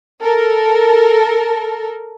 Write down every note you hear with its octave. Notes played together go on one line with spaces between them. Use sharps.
A4 A#4